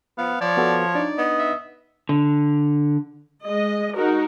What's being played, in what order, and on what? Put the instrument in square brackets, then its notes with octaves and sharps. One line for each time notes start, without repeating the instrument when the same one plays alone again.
[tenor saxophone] F3 [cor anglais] B3 [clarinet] F5
[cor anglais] F3 [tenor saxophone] C#5 [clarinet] D5
[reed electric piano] B3 F#4 A4
[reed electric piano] D4 D#4 [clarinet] D5
[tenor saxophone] B3 [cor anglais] D#5
[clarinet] E5
[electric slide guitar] D3
[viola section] G#3 D#5
D#4 F#4 A#4